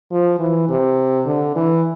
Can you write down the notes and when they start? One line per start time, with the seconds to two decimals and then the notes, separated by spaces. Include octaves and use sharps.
0.11 F3
0.39 E3
0.69 C3
1.26 D3
1.56 E3